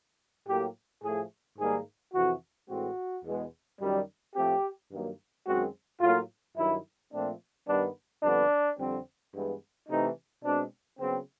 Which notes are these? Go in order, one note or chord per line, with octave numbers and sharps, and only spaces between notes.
A2 F#3 A#3 G4
A2 F3 A3 G#4
G#2 D#3 G3 A#3 G#4
F2 C3 E3 F#4
A2 E3 G#3 C4 F#4
E2 B2 G#3 B3
F#2 D#3 G3
A2 F3 A3 C4 G4
G2 D#3 F#3 A#3
F#2 D#3 G#3 C4 F#4
A2 F#3 A#3 F4
G2 D#3 F#3 E4
A#2 F3 A3 C4 D4
G2 D#3 G3 B3 D4
F2 D3 G3 B3 D4
F2 D3 G3 C4
G2 E3 G#3 B3
C3 E3 A3 D#4
B2 G#3 C4 D4
C#3 F#3 B3 C4